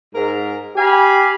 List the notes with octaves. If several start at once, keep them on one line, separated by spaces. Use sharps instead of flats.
G#2 A#4
G4 F5 G#5 B5